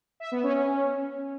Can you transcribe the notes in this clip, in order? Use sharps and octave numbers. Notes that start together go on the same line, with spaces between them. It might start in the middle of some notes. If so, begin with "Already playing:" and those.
E5
B3
C#4
C#4